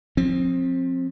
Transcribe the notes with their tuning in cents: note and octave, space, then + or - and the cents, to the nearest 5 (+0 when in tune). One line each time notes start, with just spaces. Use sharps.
F3 +30 C4 +15